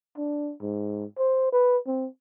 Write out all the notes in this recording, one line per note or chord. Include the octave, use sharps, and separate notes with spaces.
D4
G#2
C5
B4
C4